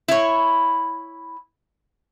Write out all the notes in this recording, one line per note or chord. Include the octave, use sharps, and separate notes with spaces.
E4 C#5